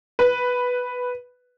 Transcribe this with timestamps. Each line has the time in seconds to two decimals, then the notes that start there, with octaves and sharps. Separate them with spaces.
0.19 B4